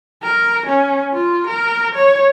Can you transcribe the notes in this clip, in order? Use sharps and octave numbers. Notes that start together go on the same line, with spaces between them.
A#4
C#4
F4
A#4
C#5